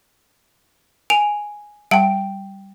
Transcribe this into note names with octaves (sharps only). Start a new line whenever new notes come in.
G#5 D7 F7
G3 F#5 G5 A5 D7